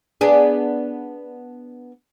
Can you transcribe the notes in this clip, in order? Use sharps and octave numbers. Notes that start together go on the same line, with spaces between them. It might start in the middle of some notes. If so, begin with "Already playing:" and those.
B3 D4 G#4